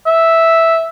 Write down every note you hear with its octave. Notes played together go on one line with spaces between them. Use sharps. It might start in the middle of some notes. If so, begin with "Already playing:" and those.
E5